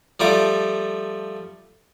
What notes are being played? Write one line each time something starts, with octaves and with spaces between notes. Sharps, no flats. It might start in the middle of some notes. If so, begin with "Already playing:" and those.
F3 G3 A3 D6